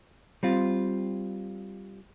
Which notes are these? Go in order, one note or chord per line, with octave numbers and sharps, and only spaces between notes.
G3 C4 F4